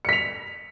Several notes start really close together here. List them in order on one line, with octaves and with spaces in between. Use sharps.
C#7 B6 F7